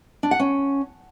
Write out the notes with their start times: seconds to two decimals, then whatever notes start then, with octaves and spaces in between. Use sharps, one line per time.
0.23 D4
0.31 F#5
0.40 C#4